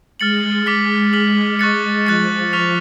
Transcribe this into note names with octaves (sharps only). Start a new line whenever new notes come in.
G#3 F6 A6 C#7 F#7
G#3 D6 F6 B6
F6 B6 F#7
C#6 F#6 A6 C#7
F3 F#6 A6 C#7
C#6 F6 B6 F7